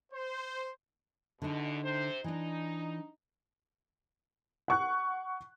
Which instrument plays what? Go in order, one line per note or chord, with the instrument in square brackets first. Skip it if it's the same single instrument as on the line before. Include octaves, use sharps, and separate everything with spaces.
[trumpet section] C5
[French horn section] E2 B2 [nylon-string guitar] D3 D#4
[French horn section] C3 C5
[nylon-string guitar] E3 D4 [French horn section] D#4
[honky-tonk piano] F#5 C#6 F#6